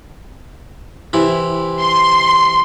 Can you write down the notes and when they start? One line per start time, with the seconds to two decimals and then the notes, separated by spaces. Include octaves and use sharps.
1.13 C3 E3 E4
1.81 C6